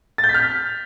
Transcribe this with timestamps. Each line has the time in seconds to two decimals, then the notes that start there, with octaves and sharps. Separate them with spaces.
0.18 A6
0.24 G6
0.29 B6
0.34 F6
0.40 B6